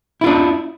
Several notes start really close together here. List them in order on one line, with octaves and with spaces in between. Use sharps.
E4 F4 D4